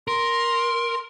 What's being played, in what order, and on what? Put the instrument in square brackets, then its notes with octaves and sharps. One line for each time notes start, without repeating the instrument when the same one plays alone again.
[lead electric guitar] A#4 [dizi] C6